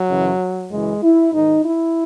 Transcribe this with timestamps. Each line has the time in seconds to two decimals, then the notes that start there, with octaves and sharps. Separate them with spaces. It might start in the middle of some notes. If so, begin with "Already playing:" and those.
Already playing: F#3
0.09 F#2 C#3 E3
0.70 F#2 C#3 E3 G#3
1.02 E4
1.32 G#2 D#3 D#4
1.65 E4